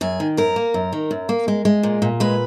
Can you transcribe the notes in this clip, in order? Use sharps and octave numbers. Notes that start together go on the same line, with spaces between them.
F#2 G#4
D#3
F#2 A#4
A#3
F#2
D#3
F#2
A#3
G#3
G#3
A#2
A#2
G#3 B4